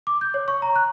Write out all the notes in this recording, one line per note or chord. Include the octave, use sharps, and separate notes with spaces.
D6
G6
C#5
C#6
A#5
F#6